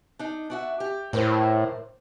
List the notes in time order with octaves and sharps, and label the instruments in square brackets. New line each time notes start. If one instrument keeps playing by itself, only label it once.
[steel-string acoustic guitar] D4 D#4
D4 F#4 E5
G4
[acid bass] A2 [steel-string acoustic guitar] D4 A#4 C5